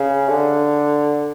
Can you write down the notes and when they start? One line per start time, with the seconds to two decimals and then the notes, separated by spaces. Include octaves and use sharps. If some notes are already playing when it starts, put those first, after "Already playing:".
Already playing: C#3
0.29 D3